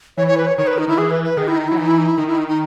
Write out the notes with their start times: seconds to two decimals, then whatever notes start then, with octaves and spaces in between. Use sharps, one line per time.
0.17 E3 C#5
0.27 C#5
0.37 B4
0.47 C#5
0.57 D#3 C#5
0.67 B4
0.78 D#4
0.88 D#3 E4
0.98 E3 G#4
1.11 B4
1.24 B4
1.37 D#3 G#4
1.47 E4
1.57 D#4
1.68 F#3 E4
1.77 E3 D#4
1.88 E4
1.98 D#4
2.07 E4
2.18 D#3 D#4
2.27 E4
2.38 D#4
2.48 D#4